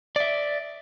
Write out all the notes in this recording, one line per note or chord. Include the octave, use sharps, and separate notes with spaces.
D5 E5